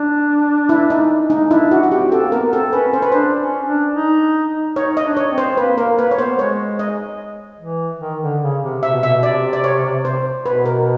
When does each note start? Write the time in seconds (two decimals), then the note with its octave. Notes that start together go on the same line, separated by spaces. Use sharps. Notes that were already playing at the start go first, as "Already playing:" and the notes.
Already playing: D4
0.69 E4
0.90 D#4
1.30 D#4
1.50 D4 E4
1.71 F#4
1.83 F#4
1.91 C4 G4
2.12 A4
2.22 A#3
2.32 B3 A#4
2.53 C4 A4
2.72 C#4 B4
2.93 C#4 C5
3.02 B4
3.12 D4 C5
3.41 C#4
3.67 D4
3.95 D#4
4.76 D#4 C#5
4.97 D#5
5.03 D4
5.17 C#5
5.30 C4
5.38 C5
5.57 A#3 B4
5.78 A#3 A#4
5.98 A#3 B4
6.11 C#5
6.18 B3 C5
6.38 G#3 C#5
6.79 D#5
7.60 E3
8.01 D#3
8.22 D3
8.42 C#3
8.63 C3
8.83 C3 E5
8.91 B2
9.03 E5
9.06 B2
9.23 C3 D5
9.53 D5
9.64 C#5
10.05 C5
10.46 B2 B4
10.66 A#4